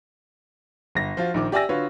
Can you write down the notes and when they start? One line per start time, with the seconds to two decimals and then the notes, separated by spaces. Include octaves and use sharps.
0.95 G1 A#6
1.17 F3 F4 F#4
1.34 A#1 D#3 D6
1.52 G4 D5 E5 G#5 E6 A#6
1.69 D3 F4 F#4 B4 C#5